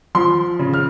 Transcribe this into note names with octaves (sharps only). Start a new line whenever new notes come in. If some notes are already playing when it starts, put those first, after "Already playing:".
F3 C6
C#3
F6